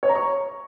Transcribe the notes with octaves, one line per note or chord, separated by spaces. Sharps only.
C#5
A#5
C#6